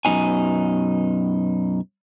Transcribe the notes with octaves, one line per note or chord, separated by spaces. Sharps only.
F#2 B2 D#4 G#5